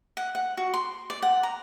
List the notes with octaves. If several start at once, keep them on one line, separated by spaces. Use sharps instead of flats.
F#5
F#5
F#4
C6
D5
F#5
A#5